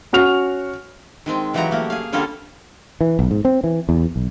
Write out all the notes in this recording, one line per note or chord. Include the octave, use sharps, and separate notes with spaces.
C#4 F#4 F6 F7
D#3 G#3 C4
C#3 E3 F#3 F#4 G4 A#5
A3 A#3
G#4 F5
D3 G3 A#3 C#4 F4 A4
E3
B1
G#2
C4
E3
E2
B1